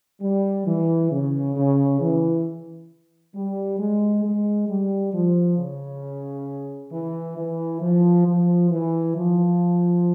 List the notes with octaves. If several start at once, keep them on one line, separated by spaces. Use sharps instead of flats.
G3
E3
C#3
C#3
E3
G3
G#3
G#3
G3
F3
C#3
E3
E3
F3
F3
E3
F3